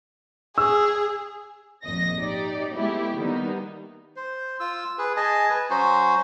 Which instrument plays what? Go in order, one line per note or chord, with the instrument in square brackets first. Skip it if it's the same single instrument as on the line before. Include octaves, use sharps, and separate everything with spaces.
[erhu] G#4 [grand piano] E6
[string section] G#1 F2 A#2 D#5 A#6
D#4 G4 D5
G#3 A3 B3 E4 G4
D#3 G3 A#3 B3 D#4
[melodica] C5
F4 E6
G#4 B4
G#4 D#5 G#5 A5
B4
F#3 C#4 F#4 C5